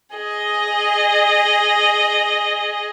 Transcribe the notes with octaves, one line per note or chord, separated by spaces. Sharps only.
G#4 D#5